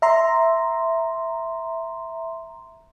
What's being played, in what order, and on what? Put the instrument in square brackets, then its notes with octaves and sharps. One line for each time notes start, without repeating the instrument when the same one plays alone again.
[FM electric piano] E5 A#5 C6